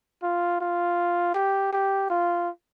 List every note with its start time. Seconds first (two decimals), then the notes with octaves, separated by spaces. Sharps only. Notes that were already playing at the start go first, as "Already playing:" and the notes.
0.23 F4
0.61 F4
1.34 G4
1.73 G4
2.10 F4